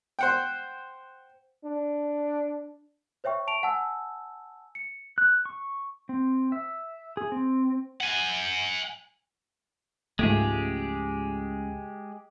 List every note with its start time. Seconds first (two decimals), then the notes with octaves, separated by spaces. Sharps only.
0.19 C5 F#5 G5
1.65 D4
3.24 C5 C#5 E5 G5 C#6
3.47 A5 C#6 D7 F7
3.63 F#5 G#5 A5 E6
4.75 C#7
5.18 F#6
5.45 C#6
6.09 C4
6.52 E5
7.17 G#4
7.32 C4
8.00 F#5 G#5
10.19 C#2 G#2 F3 G#3 A3 G4 G#4